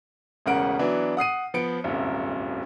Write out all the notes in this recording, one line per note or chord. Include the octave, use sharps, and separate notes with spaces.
E1 A1 C#3 A#4 F#5 D7
E3 F#3 B3 D4
F#5 D#6 C7 D#7
F3 B3 C#7 D7
D1 G1 C2 F#2